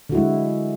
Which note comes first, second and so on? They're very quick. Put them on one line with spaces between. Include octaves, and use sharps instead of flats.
D3 F#4 E4 G#3